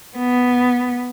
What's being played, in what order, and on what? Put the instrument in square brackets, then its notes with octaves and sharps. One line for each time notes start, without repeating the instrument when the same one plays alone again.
[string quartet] B3